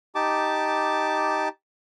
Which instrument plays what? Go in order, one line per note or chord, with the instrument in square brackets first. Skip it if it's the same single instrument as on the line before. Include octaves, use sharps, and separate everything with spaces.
[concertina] D#4 G4 A5 D6